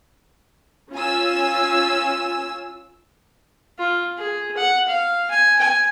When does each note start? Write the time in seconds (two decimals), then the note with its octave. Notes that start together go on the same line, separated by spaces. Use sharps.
0.92 C#4 F4 G#5 E6
3.79 F4
4.18 G#4
4.57 F#5
4.88 F5
5.30 G#5
5.59 G#5